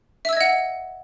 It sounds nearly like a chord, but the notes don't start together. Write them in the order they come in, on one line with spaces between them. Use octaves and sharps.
E5 E6 G#6 D#5 F#5